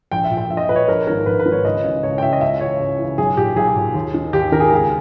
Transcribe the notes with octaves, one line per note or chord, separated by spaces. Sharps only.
A#1 G5
E5
A#2
G5
A#1 E5
D#5
E5
A#2 B4
C#5
A#1 A#4
G#2 D#3 A#4
A#1 B4
B4
G#2 D#3
C#5
C#2 D#5
C#3 E3
C#2 C#5
G5
C#3 E3 E5
D#5
C#2 E5
C#3 E3 C#5
C#2
C#3 E3
B1 G#4
A#2 G4
B1 G#4
A#2
D#2
D#3
D#2 G4
D#3 A#4
G#4
G4
C#2 G#4